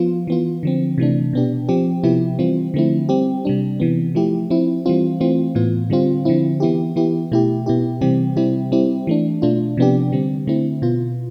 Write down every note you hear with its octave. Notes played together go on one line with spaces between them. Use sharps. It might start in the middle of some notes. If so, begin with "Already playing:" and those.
Already playing: F3 B3 F4
E3 B3 F4
D3 F3 C4
C3 E3 A3 D4
B2 B3 D4 G4
F3 C4 G4
C3 F3 B3 E4 G4
E3 G3 C4 F4
D3 F3 A3 C4 E4
G3 C4 G4
C3 G3 D4
C3 E3 B3
F3 A3 E4 G4
F3 C4 E4
E3 G3 C4 F4
E3 A3 C4 F4
A2 E3 B3 F4
D3 G3 C4 F4
D3 F3 C4 E4
E3 B3 E4 G4
E3 B3 E4 G4
B2 A3 E4 G4
B2 B3 E4 G4
C3 E3 G3 C4 G4
C3 G3 C4 E4 G4
G3 C4 E4 G4
E3 A3 D4
B2 A3 D4 F4
C3 F3 B3 D4 G4
D3 G3 C4
D3 A3 C4 E4
B2 B3 F4